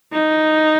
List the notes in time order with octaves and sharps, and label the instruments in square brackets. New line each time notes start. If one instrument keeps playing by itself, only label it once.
[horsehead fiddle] D#4